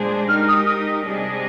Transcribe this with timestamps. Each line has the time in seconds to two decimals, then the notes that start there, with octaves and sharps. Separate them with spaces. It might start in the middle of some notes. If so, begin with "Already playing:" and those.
Already playing: A#2 G#3 D4 G#4 C5
0.29 G#3 D#4 G4 A#4 F6
0.48 D#6
0.66 D#6
1.05 C3 G3 D4 G#4 D#5